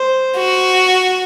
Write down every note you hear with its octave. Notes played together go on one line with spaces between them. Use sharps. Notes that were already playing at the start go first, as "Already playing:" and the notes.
Already playing: C5
F#4